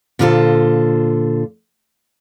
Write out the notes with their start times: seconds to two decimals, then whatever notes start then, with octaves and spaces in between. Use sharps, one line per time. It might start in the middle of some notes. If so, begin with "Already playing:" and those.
0.19 A#2 D3 F4 G4 A4 C5